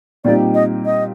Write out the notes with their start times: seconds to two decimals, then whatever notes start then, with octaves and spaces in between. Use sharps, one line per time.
0.25 A#2 G3 C4 D#4 G4 D5
0.54 D#5
0.85 D#5